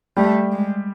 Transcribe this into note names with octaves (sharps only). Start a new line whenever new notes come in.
G3 A3 G4
G#3